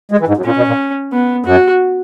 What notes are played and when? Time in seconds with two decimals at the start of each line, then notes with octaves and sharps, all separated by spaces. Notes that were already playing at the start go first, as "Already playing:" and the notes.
0.11 G#3
0.20 E3
0.28 G#2
0.37 F#2
0.45 A#2 C#4
0.57 B2
0.67 A#2
1.13 B3
1.46 F#2 F#4